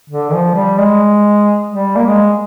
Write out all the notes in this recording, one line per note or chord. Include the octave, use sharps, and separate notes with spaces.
D3
F3
G3
G#3
G3
A#3
G#3